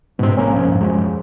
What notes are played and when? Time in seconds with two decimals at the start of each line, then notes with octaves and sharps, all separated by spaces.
0.19 G#2 B2 C4
0.37 G#1 A#3 C#4
0.53 C2 F3 C#4
0.65 F2 G#2
0.81 E1 F#2 G#3